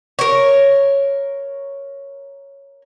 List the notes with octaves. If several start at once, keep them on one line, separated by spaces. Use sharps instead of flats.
A#4 C#5